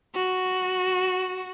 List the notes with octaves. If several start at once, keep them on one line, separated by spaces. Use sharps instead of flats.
F#4